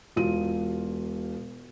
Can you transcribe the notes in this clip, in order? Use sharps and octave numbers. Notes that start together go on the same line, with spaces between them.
E1 F4 D#7